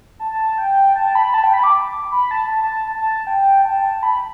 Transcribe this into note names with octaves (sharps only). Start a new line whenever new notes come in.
A5
G5
A5
B5
A5
G5
B5
D6
B5
A5
A5
A5
G5
A5
A5
B5